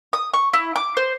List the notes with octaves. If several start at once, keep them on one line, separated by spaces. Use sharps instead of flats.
D#6
C#6
E4
D6
C5